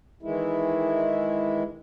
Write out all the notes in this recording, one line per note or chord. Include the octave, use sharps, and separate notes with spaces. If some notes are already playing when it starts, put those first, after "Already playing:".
D#3 E3 G#3 E4